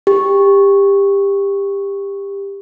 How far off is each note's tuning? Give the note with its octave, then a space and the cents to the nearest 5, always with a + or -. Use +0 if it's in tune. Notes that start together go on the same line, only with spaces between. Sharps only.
G4 +20